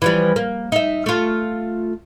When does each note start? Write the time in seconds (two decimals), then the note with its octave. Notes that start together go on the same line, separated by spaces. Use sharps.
0.02 E3 F3 G3
0.36 A#3
0.72 D#4 E5
1.06 A3 F4